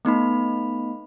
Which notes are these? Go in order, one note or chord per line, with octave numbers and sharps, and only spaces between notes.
A3 B3 D#4 B5